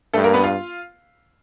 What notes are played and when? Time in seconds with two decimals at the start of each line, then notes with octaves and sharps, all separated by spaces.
0.14 G2 A3 A4
0.24 A#3 A#4
0.34 B3 B4
0.44 F4 F5